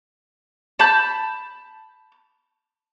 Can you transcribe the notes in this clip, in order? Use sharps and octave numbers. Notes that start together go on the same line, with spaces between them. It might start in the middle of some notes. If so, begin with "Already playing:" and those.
A5 B5 G6